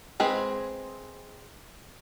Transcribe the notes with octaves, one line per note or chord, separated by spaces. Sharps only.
G#3 C4 G#4 B4